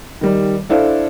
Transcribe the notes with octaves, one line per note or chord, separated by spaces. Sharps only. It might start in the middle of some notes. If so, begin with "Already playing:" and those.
D#3 G3
D4 E4 A4 C5 F5